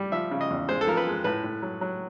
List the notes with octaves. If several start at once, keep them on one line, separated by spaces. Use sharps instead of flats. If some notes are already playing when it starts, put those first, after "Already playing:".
Already playing: G3
F3 E5
C#3
D#5
E2
G#3 C5
A4
F3 A#4
B4
G#3
A2 B4
A2
F#3
F#3